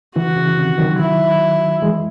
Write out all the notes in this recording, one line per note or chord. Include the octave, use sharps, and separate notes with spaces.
C#3 E3 F#4
C#3 E3
C3 D#3
D#3 F#3
E4
E3 G#3